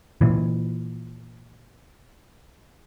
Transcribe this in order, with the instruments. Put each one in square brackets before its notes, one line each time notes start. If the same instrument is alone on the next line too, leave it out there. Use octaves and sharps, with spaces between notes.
[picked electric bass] A#2 E3